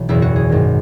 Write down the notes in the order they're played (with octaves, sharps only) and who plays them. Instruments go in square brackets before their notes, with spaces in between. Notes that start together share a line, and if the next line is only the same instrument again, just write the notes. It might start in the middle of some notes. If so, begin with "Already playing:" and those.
Already playing: [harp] B1 E3
F#1 E2 B2 E4
F#4
G#4
G#1 F#2 D#3